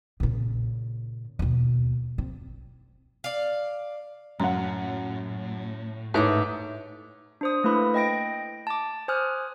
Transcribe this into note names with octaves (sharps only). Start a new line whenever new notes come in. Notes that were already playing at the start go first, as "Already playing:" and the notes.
A#2 C#3
D#2 B2
C4
D5 F5
F#2 A2 F#5 A#5
G#2 A3 E4 B4 C#5 D6
D4 C5 D#6
A3 A#3 E4 B4 B5
D#5 G5 A#6 D7
A5 D6
C5 G#5 D#6 F6 F#6